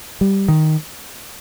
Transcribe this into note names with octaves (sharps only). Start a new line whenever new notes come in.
G3
D#3